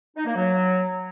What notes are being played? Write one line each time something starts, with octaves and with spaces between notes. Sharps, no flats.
D#4
A#3
F#3